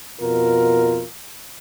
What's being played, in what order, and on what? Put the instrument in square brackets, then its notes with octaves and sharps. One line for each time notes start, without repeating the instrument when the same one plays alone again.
[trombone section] F2 B2 F4 A#4